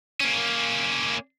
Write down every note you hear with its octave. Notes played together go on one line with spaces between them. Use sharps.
A#3 C#4